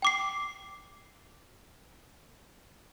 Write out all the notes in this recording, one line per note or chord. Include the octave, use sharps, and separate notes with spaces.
G5 D6 C7